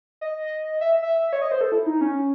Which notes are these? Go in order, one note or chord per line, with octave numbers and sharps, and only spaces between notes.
D#5
E5
E5
C#5
D#5
C5
A4
E4
D#4
C#4